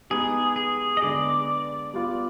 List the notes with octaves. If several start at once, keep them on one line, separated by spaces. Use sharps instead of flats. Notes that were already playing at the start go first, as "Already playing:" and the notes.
G#3 B3 D#4 G4 G#4
G#4
D#5
D3 G#3 B3 D5
G3 B3 F4